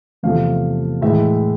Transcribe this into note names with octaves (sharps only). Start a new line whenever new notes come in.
E2 C3 F3 A3 F5
A2 E3 G#3 E5